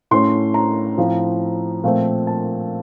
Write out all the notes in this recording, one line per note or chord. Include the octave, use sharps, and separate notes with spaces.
A2 A3 C#4 C6
A#5
A2 F3 C4
A#2 F3 A3 C4
A5